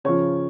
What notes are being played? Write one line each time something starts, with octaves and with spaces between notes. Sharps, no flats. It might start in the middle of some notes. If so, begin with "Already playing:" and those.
C#3 F3 C#5